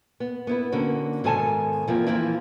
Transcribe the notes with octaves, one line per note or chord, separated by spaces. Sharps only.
B3
B3 E4 B4
D3 A#3 C4 C#4 F#4
G#2 B2 D#3 A4 G#5 A5
E2 F3 A#3 C4
E3 F3 A#3 C4 E4